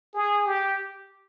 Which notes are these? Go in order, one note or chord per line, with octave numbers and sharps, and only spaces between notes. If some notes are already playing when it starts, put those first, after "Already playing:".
G#4
G4